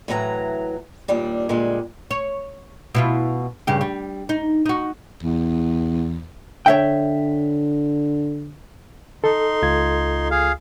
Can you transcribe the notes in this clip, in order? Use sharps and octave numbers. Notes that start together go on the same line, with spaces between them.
A2 E3 F#3 B4 A#5
D#2 A#2 G3 D4
A#2 D3 G3 G#3
C#5
B2 E4 F4
G2 C#3 G4
G3
D#4
D#4 F#4
E2
D3 C#5 E5 G5
D#4 A4 C6
C#2 F4 G#6
G#4 F5